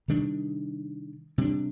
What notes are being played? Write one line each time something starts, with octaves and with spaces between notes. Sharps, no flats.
C3 D#3 G3 D4
C3 G3 D4